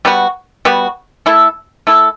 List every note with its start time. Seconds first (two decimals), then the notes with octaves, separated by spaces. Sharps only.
0.05 G3 B3 F#4
0.65 G3 B3 F#4
1.26 A3 E4 A4
1.87 A3 E4 A4